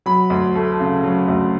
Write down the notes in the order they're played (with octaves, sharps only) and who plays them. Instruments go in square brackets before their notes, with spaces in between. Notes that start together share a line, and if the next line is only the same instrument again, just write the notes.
[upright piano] F#3 B5
D2
A3
C#3
F#3
D2